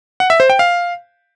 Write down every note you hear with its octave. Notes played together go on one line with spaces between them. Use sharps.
F#5
E5
C5
G5
F5